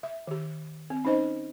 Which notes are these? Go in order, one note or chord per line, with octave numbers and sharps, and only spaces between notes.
E5
D#3 G4
C4
C#4 D#4 C5 D#5